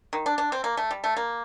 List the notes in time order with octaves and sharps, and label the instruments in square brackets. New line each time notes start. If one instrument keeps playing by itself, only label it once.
[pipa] D#3
D4
D4
C4
A#3
A3
G3
A3
A#3